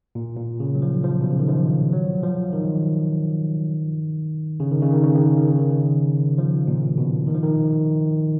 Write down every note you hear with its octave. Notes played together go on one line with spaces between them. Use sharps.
A#2
A#2
C#3
F#3
F3
F3
B2
C#3
D#3
F3
F#3
F3
D#3
C#3
D#3
C#3
D#3
C#3
D#3
C#3
D#3
C#3
D#3
C#3
F3
A#2
B2
D#3
F3
D#3